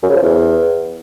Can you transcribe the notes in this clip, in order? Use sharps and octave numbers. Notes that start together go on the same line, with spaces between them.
F#2
C#3
F3
E2